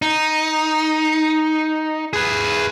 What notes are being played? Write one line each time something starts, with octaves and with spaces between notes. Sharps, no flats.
D#4
G#4 B4